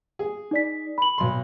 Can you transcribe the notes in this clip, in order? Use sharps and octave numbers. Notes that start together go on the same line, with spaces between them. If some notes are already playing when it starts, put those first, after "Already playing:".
G#4
D#4 D5 B6
B5 F#7
B1 C6